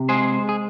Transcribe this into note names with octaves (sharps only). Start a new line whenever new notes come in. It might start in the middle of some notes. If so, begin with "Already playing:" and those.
Already playing: C3
G#3 G#4 C5
G#4